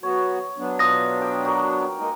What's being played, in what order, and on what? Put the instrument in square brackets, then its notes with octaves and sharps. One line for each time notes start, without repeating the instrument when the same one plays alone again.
[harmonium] F#3 B3 F#4 [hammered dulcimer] C#5
[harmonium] F#3 B3 D4
[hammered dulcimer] B2 F4 [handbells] D#6 A#6
[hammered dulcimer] G4 G5
F#4 G4 A#4
[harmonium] G#3 A#3 D#4